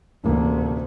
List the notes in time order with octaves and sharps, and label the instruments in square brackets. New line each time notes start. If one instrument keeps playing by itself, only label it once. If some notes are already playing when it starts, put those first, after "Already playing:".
[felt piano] A1 A#3 [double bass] D2 C3